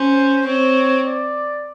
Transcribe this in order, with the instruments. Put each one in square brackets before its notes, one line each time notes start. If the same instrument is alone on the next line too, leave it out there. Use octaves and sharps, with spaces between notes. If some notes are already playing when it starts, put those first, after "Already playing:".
Already playing: [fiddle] C#4 [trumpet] C5
[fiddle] C4 [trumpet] C#5
[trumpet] D5